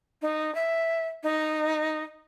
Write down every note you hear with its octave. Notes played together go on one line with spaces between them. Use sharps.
D#4
E5
D#4